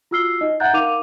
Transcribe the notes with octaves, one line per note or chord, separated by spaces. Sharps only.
F4 F#4 E6 F6 C7 G7
D#4 D#5
E5 F#5 A#5 F#6 G6 A6
D#4 A#4 F5 D6 D#7 F7